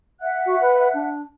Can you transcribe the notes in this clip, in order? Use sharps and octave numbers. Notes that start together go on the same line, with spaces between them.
E5 F#5 F#6
F#4
B4
D4